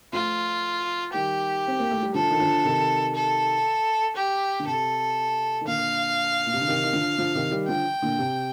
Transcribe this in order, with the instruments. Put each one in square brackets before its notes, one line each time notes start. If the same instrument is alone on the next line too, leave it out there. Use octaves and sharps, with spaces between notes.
[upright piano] F3 A3 [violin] F4
[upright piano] D#3 G3 [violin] G4
[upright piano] C4
A#3
A3
G3
[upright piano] D3 F3 [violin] A4
[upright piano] D#3
D3 F3
C3 D#3
[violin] A4
G4
[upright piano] D3
[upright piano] C3 [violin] A4
[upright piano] D#3
[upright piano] A#2 D3 [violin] F5
[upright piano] A#2
C3
D3
C3 D#3
D#3
D3 F3
D3 F3
C3 D#3
D#3 G3
[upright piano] D3 F3 [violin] G5
[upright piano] A#2 D3
C3